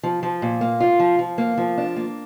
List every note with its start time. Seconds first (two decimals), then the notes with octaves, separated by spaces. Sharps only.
0.03 F3
0.23 F3
0.42 A#2
0.61 A#3
0.80 F4
0.99 F3
1.19 F3
1.38 A#3
1.57 F3
1.78 D4
1.96 A#3